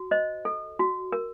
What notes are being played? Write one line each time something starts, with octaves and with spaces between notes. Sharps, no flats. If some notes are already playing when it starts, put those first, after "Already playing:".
Already playing: F#4
C5 D#5
A4
F#4
A#4